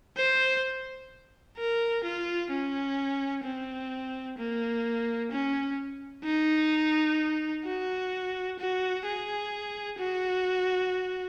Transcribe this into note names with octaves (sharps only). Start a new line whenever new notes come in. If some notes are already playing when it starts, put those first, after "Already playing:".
C5
A#4
F4
C#4
C4
A#3
C#4
D#4
F#4
F#4
G#4
F#4